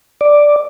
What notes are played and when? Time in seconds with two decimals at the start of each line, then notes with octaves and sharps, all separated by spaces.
0.21 D5